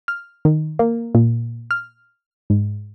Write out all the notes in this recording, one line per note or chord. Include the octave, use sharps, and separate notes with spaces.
F6
D#3
A#3
A#2
F6
G#2